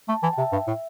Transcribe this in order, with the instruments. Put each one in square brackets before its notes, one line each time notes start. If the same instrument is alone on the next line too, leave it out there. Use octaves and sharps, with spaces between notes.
[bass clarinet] A3 [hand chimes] A5
[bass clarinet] E3 [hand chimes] A5
[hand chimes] G5
[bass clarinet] C3 [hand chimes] E5
[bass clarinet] G2
A2